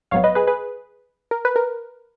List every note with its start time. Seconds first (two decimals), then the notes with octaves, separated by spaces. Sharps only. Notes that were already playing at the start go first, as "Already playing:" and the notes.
0.11 A#1 G#2 F#3 B3 C#5 F5
0.24 B4 D#5
0.35 G#4 B4
0.47 G#4 B4
1.31 A#4
1.45 B4
1.56 A#4